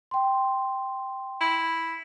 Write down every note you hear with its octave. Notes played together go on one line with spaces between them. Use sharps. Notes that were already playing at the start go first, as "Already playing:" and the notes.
G5 C6
E4